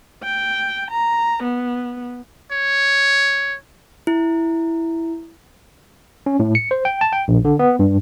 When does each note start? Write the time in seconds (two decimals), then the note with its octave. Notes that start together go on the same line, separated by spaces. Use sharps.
0.23 G5
0.91 A#5
1.43 B3
2.52 C#5
4.07 E4
6.26 C#4
6.40 A2
6.55 C#7
6.71 C5
6.85 G5
7.01 A5
7.12 G5
7.28 A#1
7.45 D3
7.59 B3
7.79 G2